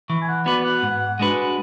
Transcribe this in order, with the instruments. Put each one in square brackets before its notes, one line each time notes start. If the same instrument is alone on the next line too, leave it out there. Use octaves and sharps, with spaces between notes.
[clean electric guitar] E3 [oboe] C#6
[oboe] G#5
F#5
[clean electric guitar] B3 F#4 B4 [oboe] D5
[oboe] F#5
[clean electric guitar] G#2
G#3 D4 F#4 B4